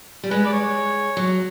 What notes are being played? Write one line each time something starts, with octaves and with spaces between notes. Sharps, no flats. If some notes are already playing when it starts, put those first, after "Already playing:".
G3
G#3 B4
D5
C#5
F#3